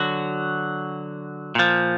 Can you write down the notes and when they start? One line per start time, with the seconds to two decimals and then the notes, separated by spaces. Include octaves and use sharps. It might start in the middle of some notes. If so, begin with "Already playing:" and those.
Already playing: D3 F#3 F#4
1.55 A#2 F3